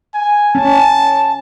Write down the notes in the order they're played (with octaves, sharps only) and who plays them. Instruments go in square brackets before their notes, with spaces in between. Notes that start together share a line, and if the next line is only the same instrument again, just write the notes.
[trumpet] G#5
[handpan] C#4 [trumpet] A5